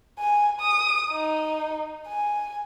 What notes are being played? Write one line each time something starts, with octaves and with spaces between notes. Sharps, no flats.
G#5
D#6
D#4
G#5